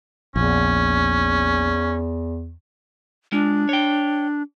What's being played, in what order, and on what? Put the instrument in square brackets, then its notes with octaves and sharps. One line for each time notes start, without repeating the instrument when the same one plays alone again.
[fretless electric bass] A#1 [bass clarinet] E2 [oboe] C#4
[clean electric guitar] G#3 F4 [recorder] D4
[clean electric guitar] C#5 G5